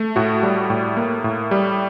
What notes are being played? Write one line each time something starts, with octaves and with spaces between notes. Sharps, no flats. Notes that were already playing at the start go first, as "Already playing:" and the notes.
Already playing: A3
A2 F#4
G3
A2
A#3
A2
G3